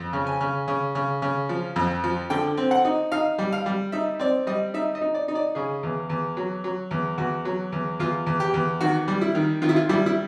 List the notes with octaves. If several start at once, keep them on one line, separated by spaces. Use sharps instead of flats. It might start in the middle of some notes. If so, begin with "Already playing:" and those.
Already playing: F2
C#3
G#5
C#3
C#3
C#3
C#3
F3
F2
F3
D3 G5
C4
F#5
D#4
D#4 F5
G3
F5
G3
D#4 E5
C4 D5
G3 D#5
D#4 E5
D#5
D#4
D5
D#4
D5
C#3 G#4
E2
E2
F#3
F#3
E2
E2 F#4
F#3
E2
E2 F4
E2
G4
E2
D#3 F#4
G3
E4
D#3
D#3 F4
E4
F4
G3 E4
E4